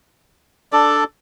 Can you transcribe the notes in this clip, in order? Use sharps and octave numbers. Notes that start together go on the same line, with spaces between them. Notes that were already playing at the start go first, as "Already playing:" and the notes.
D4 A4 D5